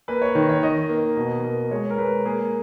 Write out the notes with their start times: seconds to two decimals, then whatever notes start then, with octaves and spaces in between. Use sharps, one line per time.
0.08 A#3 B4
0.22 C#5
0.35 D#3
0.49 C#5
0.63 D#3 D#5
0.89 A#3
1.17 B2
1.44 A#3
1.71 G#3 C#5
1.90 A#4
1.98 G#3 B4
2.25 A#3 G#4